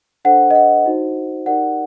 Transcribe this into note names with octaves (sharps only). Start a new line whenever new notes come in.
D4 A4 C5 F#5
D#5
F#5
D#4 F#4 C5
D#4 G4 A#4 D5 F#5